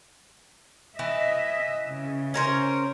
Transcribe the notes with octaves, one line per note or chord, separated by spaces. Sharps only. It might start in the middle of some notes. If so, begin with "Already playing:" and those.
E3 D#5 E5
C#3
C#4 A#4 C5